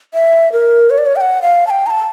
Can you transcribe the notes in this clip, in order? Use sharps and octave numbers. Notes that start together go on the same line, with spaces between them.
E5
A#4
C#5
D5
C#5
G5
F#5
F5
A5
G5
A#5
A5